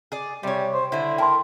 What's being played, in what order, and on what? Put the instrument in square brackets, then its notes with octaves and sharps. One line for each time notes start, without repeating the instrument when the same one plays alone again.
[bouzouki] G#4 D5
[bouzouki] C3 C#5 [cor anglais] G3
[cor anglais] C5
[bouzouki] D3 C5 [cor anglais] E4
[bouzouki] A#4 [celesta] G5 A5 C6